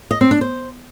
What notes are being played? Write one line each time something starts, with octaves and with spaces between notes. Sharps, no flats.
D#5
C4
D4
C5